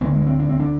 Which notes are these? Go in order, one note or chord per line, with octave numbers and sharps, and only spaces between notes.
D2 D3 B3
G#3
C4
D4
C4
D4